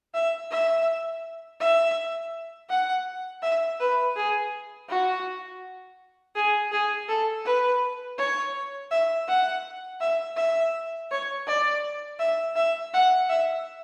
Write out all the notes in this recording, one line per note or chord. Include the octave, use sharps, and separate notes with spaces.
E5
E5
E5
F#5
E5
B4
G#4
F#4
G#4
G#4
A4
B4
C#5
E5
F#5
E5
E5
C#5
D5
E5
E5
F#5
E5